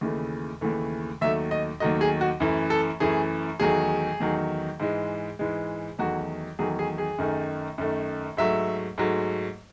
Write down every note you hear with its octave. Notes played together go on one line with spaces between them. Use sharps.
D#2 C#3 E3 A3
D#2 C#3 E3 A3
D#2 D#3 F#3 A3 E5
D#5
D#2 D#3 F#3 A3 D#5
G#4
F#4
F#2 E3 A3
A4
F#2 E3 A3 G#4
E2 D#3 F#3 A3 G#4
E2 D#3 F#3 A3
G#2 E3 G#3
G#2 E3 G#3
E2 D#3 F#3 A3 F#4
E2 D#3 F#3 A3 G#4
G#4
G#4
F#2 D#3 A3
F#2 D#3 A3
G#2 F#3 A3 E5
G#2 F#3 A3